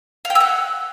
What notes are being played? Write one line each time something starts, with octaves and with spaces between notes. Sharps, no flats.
F5
G5
E6
F#5